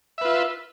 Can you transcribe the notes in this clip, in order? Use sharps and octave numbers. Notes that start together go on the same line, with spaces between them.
F4 B4 E5